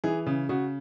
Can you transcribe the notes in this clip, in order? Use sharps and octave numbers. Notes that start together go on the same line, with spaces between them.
E3 G#4
C#3
C#3 F#4